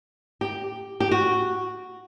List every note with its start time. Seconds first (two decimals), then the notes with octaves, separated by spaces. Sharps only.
0.41 G4
1.00 G4
1.11 F#4